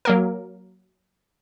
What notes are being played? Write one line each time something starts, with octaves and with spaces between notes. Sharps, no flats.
F#3 A#3 A#4